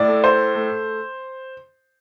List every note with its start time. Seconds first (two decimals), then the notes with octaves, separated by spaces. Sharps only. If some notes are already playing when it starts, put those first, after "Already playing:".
Already playing: A2 D5
0.08 A3
0.24 C5
0.55 A3